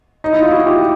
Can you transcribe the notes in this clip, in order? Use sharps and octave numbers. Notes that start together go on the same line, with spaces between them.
D#4
E4
F4
E4 F#4
F4 G4